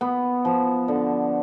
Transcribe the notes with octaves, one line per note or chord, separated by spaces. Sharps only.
B3
F3
D3